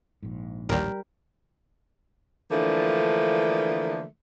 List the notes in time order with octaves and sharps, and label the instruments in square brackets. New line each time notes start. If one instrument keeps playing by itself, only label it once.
[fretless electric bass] A#1 G#2
[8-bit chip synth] A1 D#2 [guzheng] G3 A#4
[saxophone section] D3 E3 F3 A3 A#3 D4